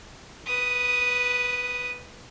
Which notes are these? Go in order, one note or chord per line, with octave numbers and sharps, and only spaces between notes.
B4 D#6